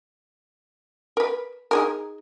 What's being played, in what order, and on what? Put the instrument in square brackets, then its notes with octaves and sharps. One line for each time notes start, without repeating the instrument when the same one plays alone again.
[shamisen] A#4 B4
D#4 G#4 A#4